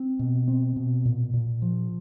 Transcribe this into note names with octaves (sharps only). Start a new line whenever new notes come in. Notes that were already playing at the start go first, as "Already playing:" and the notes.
Already playing: C4
B2
C4
B2
A#2
A#2
F3